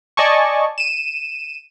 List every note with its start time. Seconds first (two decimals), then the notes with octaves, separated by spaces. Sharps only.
0.17 D5 D#5 G#5 A5 C#6
0.78 D#7 E7